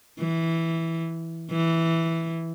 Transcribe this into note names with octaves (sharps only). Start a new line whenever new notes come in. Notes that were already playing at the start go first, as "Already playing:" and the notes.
E3
E3